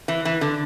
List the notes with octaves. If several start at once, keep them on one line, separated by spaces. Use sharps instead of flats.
E3
E3
D3